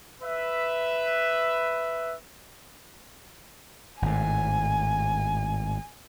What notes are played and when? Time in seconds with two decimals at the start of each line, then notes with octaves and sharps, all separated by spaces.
0.23 B4 E5
4.02 G#1 A2 G#5